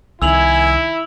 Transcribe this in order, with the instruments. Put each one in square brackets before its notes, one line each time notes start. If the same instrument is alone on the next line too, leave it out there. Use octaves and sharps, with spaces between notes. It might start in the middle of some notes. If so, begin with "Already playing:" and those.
[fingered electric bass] C2 D#3 [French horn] E4 [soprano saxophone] G#5 [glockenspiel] E6 F7 F#7